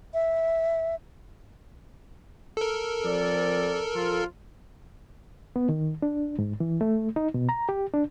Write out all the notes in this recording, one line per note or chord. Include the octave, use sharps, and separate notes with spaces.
E5
A4 A#4
F3 C4 D5
F3 F4
B3
D#3
D4
G#2
E3
A3
D#4
B2
A#5
G4
D4